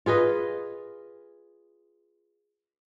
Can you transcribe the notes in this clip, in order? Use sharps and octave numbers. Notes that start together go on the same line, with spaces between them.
F4 G#4 B4 D#5